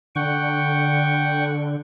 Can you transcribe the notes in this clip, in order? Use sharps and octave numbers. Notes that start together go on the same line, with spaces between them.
D3 F#5 G5 C#6